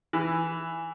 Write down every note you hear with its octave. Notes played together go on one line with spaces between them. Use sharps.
E3